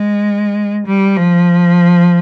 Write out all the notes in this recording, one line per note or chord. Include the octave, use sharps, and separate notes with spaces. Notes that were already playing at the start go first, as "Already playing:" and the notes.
Already playing: G#3
G3
F3